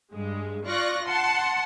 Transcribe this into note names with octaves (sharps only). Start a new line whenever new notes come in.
G2 G#3
F4 D5 C#6 F#6 A#6
F#5 A5 C6